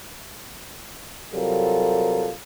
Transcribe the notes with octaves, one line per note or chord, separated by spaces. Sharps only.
C3 F#3 G3 F4 A4 A#4